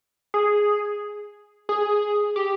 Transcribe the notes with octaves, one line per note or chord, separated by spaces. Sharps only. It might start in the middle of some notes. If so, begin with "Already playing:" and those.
G#4
G#4
G4